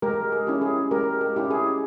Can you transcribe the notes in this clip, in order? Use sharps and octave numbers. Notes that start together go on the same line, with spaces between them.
G#3 G4 A#4
G#4
C#4 E4 G4
G#4
G#3 G4 A#4
G4
C#4 E4 G4
G#4